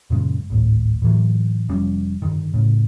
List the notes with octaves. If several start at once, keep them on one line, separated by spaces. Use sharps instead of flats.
F#2 A#2 C#3 G#3
D1 G#1 A2
A2 D3 E3 F#3
F1 F3 G3 C#4
G2 D3 D#3
A2 C#3